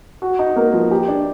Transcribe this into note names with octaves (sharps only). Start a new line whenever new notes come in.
F#4
D#4
A#3
F3
G4
D4